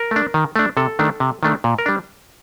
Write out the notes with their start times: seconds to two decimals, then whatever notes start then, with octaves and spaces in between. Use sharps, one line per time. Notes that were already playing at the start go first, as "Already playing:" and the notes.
Already playing: A#4
0.11 A3 D4
0.34 D#3
0.56 A3 D4
0.77 C3 A4
0.99 D#3 A3 D4
1.20 C3
1.43 D#3 A3 D4
1.64 A#2
1.78 A#4
1.86 G3 D4